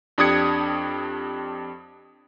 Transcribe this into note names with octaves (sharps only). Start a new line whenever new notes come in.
F2 D4 G4 D#6 G#6 C#7